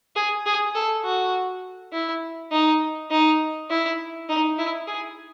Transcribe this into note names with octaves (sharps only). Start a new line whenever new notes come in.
G#4
G#4
A4
F#4
E4
D#4
D#4
E4
D#4
E4
G#4